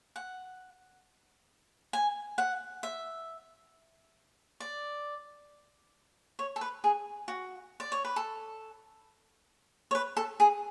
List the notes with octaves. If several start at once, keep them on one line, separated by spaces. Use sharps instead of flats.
F#5
G#5
F#5
E5
D5
C#5
A4
B4
G#4
F#4
D5
C#5
B4
A4
C#5
B4
A4
G#4